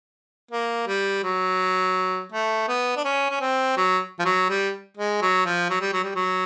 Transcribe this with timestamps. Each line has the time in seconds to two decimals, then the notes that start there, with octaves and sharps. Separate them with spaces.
0.51 A#3
0.87 G3
1.24 F#3
2.32 A3
2.68 B3
2.97 D4
3.05 C#4
3.31 C#4
3.41 C4
3.77 F#3
4.19 F3
4.25 F#3
4.49 G3
4.97 G#3
5.21 F#3
5.46 F3
5.70 F#3
5.81 G3
5.93 F#3
6.04 G3
6.15 F#3